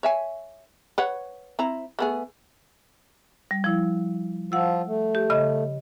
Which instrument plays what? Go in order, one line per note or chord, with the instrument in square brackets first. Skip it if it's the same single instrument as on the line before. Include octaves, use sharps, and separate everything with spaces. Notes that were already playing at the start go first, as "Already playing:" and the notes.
[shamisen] C#5 E5 G#5
B4 C#5 F#5
C4 E4 A#5
A3 B3 G#4
[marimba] G3
F3 E4
[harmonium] F3 F4 [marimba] F#5 E6
[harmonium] A3
[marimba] G4
C#3 D#5 B5